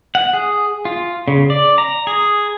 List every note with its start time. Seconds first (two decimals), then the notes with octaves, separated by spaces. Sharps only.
0.15 F#5
0.33 G#4
0.85 F4
1.28 C#3
1.50 D5
1.78 A#5
2.07 G#4